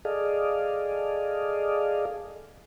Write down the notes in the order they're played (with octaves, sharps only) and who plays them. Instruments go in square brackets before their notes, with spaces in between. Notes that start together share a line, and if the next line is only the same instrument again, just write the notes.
[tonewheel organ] G#4 A4 D5 D#5 F5